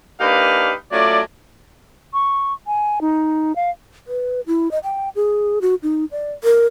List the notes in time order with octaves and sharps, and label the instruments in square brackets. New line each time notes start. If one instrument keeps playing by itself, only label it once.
[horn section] A#3 D4 D#4 G4 B4 F5
F#3 A3 C#4 F4 D5
[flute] C#6
G#5
D#4
F5
[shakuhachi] B4
E4
D#5
G5
G#4
F#4
D#4
D5
A#4